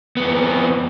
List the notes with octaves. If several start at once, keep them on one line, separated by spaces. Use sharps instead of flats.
F2 B3